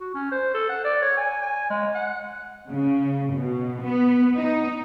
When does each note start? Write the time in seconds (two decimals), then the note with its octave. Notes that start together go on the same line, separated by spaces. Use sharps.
0.01 F#4
0.14 C#4
0.32 C5
0.54 A4
0.69 F#5
0.84 D5
1.02 C#5
1.17 G#5
1.42 G#5
1.70 G#3
1.95 F#5
2.70 C#3
3.33 B2
3.81 B3
4.37 D#4